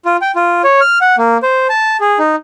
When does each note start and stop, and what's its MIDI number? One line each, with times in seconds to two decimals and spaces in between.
0.05 0.17 65
0.22 0.32 79
0.36 0.62 65
0.64 0.81 73
0.81 0.98 89
1.01 1.16 78
1.18 1.38 58
1.43 1.67 72
1.69 1.97 81
2.01 2.19 68
2.19 2.36 63